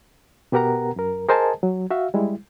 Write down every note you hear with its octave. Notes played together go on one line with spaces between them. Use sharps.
B2 B3 G4 A#4 F#5 A#5
F#2 A#4
G#4 A#4 C5 D#5 G#5 A5
F#3
F#4 E5 F5
G3 G#3 E4